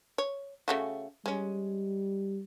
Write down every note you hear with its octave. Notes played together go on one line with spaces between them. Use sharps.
C#5
C#3 A3 F#4
G3 G#3 C#4